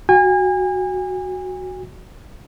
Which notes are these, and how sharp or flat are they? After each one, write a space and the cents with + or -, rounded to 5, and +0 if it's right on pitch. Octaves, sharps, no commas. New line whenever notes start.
F#4 +0 G#5 -35